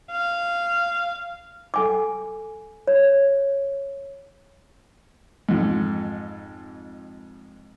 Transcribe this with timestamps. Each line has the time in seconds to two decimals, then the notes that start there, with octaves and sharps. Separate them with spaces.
0.11 F5
1.74 A4 G#5 D6
2.87 C#5
5.49 F2 G#2